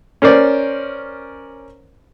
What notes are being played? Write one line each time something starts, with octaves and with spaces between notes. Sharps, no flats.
C#4 A#4 C5 D5